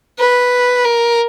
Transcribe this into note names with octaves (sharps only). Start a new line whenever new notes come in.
B4
A#4